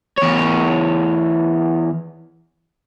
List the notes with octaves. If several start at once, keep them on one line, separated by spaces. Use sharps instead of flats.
E2 C#5